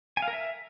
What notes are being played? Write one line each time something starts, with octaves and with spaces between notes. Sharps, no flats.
G#5
F5
A#4
E5